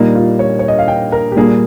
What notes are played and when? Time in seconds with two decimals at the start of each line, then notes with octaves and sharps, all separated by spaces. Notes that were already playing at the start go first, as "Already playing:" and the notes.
Already playing: A#2 G3 A#3 D#4
0.15 F4
0.39 C#5
0.59 C#5
0.68 D#5
0.79 F5
0.88 G5
1.12 A#4
1.32 G4
1.36 A#2 G3 A#3 G#4